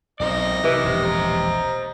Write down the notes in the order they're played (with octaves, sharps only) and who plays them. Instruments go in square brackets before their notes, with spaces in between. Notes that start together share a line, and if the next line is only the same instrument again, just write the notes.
[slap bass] B1 [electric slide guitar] C4 A#4 D5 [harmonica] D#5
[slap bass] C3 [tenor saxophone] E3 [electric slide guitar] G4 A#4
[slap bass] E1 A#1 [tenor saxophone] C3
[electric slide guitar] C5 A#5